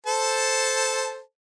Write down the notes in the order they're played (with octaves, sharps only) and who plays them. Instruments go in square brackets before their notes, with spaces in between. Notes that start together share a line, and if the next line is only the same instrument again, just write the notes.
[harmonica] A4 C5 A5